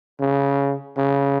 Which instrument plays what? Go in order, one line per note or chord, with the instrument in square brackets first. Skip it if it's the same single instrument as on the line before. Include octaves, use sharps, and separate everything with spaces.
[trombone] C#3
C#3